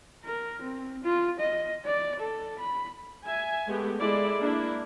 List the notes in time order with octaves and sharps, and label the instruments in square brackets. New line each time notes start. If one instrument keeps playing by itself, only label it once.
[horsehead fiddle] A#4
C4
F4
D#5
D5
A4
B5
[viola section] E5 G#5
G#3 A3 B3 G4
G#3 E4 A4 D5
A#3 D4 E4